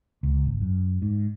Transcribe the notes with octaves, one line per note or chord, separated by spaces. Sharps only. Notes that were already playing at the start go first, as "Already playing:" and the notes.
C#2
G#1
F#2
G#2